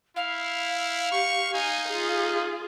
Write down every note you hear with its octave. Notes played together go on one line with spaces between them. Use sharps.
E4 F5
G4 C#6
D#4 G#5
F4 G#4